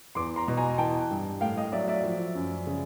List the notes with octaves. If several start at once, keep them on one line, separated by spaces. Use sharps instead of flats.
E2 C6 D6
A#5 C6
B2
G#5 A#5
E3 G5 A5
G2
A2 F5 G5
D#5 F5
F#3 D5 E5
D5 E5
F3
F#2
C#3